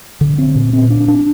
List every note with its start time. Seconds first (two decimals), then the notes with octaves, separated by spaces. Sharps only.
0.21 D3
0.38 C4
0.55 A#2
0.73 C4
0.90 D4
1.08 D4